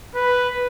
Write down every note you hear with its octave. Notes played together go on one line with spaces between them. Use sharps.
B4